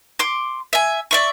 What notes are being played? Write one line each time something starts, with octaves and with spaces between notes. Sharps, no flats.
C6 D6
E5 G#5
D5 E5 C#6